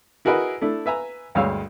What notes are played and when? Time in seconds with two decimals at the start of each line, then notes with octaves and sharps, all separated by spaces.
0.25 E4 F#4 G#4 A#4 B4 D#5
0.62 A3 D4 E4
0.86 B4 E5 G#5 A#5
1.35 D2 G2 G#3 C#5 F5 E6